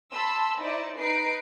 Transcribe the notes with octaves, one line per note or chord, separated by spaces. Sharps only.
A5 B5 C6 E6
D#4 E4 C5 D5 D#5
D#4 B4 A#5 C7 D7